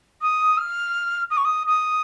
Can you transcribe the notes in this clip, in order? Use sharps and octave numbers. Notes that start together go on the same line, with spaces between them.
D#6
F6
D#6
C#6
D#6
D#6